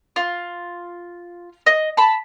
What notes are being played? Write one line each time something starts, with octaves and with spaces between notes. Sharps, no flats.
F4
D#5
A5 B5